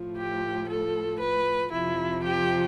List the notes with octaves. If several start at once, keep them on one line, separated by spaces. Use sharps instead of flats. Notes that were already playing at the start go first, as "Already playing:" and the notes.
Already playing: A2 F3
G4
A4
B4
F2 C3 F3 E4
G4